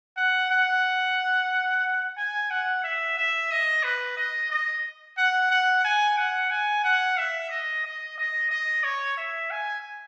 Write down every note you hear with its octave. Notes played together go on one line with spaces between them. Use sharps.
F#5
F#5
G#5
F#5
E5
E5
D#5
B4
D#5
D#5
F#5
F#5
G#5
F#5
G#5
F#5
E5
D#5
D#5
D#5
D#5
C#5
E5
G#5